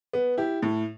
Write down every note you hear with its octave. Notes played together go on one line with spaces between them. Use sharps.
B3
E4 G4
A2